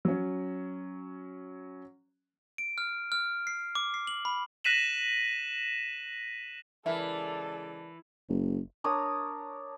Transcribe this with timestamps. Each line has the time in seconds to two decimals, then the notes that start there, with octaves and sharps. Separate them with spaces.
0.05 F#3 C#4
2.58 D7
2.78 F6
3.12 F6
3.47 C7
3.75 D6
3.94 C7
4.07 F#7
4.25 B5
4.64 F#6 A#6 B6 D#7 E7 F#7
6.86 C#3 E3 G#3 A4 A#4 D5 E5 B5
8.29 F#1
8.84 D4 A#4 C#5 D#6